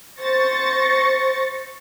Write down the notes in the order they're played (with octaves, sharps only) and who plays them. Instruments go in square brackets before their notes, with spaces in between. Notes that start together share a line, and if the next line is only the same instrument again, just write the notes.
[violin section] C5 C#6 A6 A#6 C#7